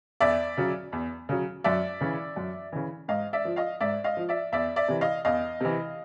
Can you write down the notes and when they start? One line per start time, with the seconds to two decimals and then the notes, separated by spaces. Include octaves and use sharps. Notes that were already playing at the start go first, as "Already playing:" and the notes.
0.20 E2 D5 E5
0.57 C#3 F#3
0.92 E2
1.29 C#3 F#3
1.64 F#2 D5 E5
2.01 C#3 E3
2.36 F#2
2.72 C#3 E3
3.08 G#2 D#5 F5
3.33 D5 E5
3.45 F3
3.56 D#5 F5
3.80 G#2 D5 E5
4.04 D#5 F5
4.17 F3
4.29 D5 E5
4.52 E2 D5 E5
4.76 D5 E5
4.88 C3 E3
5.01 D#5 F5
5.25 E2 D#5 F5
5.60 C3 E3